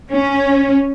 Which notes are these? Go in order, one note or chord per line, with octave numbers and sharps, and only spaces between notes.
C#4